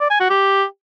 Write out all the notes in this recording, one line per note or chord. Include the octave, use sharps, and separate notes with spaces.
D5
G#5
F#4
G4